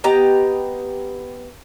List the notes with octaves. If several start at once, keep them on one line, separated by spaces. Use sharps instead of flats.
B3 G4 D#5 A#5